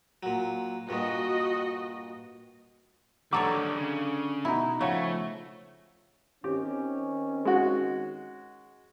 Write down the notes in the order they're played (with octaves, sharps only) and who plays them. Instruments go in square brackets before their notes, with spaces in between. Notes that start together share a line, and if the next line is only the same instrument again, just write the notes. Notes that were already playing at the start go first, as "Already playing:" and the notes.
[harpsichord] A#2 F#3
[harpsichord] G2 A#2 [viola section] F#4 D#5
[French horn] D3 [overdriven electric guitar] D#3 G3 [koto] F#3 A4 C#5 [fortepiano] D6
[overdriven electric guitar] C#3
[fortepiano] B2 [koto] D#4 E4
[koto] C#3 F#4 [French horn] F3 [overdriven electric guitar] A3 [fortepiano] C#5
[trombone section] D#3 C4 C#4 [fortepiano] G4
[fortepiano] G#3 F#4